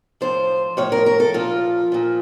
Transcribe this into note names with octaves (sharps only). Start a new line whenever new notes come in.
A2 F3 C5
A2 F3 C#5
A#4
A#4
A4
A#2 F3 F4
A#2 F3